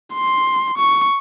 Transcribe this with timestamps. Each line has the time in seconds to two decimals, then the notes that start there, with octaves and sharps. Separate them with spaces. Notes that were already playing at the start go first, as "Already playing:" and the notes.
0.15 C6
0.78 C#6